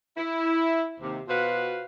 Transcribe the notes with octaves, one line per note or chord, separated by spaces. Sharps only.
E4
D#2 C3
B2 F4 F#4 B4 C5 F5